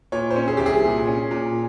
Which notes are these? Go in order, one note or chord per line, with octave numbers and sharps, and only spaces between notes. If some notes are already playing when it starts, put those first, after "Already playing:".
A#2 C#5
C5
C#4
G#4
C2 G4
G#4
A#2
C#4
A#2